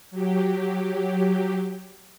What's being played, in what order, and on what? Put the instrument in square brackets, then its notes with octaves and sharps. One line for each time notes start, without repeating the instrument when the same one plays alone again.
[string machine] F#3 G4